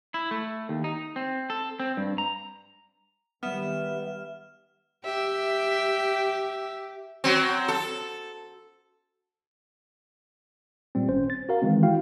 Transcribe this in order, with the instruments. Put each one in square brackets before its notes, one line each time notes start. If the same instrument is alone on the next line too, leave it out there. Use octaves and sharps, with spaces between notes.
[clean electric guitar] E4
A3
D#2
D#4
C4
A4
C4
G2
A#5
[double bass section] D#3 G3 [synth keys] B3 [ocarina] E5 [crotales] F6 E7
[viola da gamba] G4 [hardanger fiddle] E5
[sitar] F#3 C4
A4
[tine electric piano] A#2 G3 C4
G#1 C#4 C5
A6
F#4 A#4 F5
D#3 E3 G#3 C4
E4 F#4 F5 G5